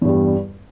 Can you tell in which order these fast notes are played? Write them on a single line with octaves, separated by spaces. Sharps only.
E2 G2 G3